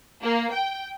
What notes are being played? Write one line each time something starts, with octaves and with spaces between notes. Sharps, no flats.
A#3
G5